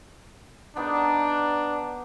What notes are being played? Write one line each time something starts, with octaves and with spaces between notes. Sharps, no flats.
B3 D4 D#4 A#4